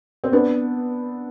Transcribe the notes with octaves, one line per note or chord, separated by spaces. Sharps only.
C4
B3 D4